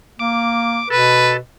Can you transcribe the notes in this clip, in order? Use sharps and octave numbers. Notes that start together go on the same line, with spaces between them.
A#3 D6
B2 A4 B4